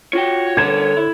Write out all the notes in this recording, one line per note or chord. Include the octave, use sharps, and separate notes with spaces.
F4 F#4 C#5 G5
G2 D3 B3 A#4 G#6 E7
E4